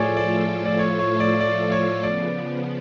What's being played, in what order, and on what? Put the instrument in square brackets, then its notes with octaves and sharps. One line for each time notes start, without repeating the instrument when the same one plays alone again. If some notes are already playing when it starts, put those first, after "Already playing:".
Already playing: [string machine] A2 F3 A3 F4 A4 [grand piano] G#4 C#5 D5
[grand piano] D5
D5
C#5
C#5
D5
D5
C#5
[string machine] C#3 F3 B3 [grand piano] D5